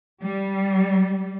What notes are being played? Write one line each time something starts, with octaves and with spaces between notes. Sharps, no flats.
G3